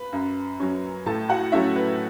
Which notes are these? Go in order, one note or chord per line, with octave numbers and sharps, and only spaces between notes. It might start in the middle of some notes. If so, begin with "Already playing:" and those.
Already playing: B4 B5
F#2
F#3 C#4
A2 A4 A5
F#4 F#5
F#3 A3 C#4 E4 E5
B4